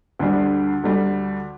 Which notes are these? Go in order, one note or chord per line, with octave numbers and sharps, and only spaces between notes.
D2 D3 G3
D2 D3 G3